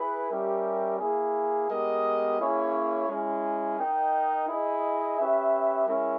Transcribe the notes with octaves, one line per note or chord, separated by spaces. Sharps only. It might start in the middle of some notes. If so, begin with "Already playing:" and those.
Already playing: E4 G#4 B4
G3 C#4 G4 A#4 E5
A#3 E4 G#4
G#3 B3 G4 A#4 D#5
A#3 C#4 E4 G#4 C#5
G#3 C#4 E4
D#4 A#4 D#5 G5
E4 G#4 D#5
C#4 G4 B4 E5
G#3 C#4 E4 A#4 E5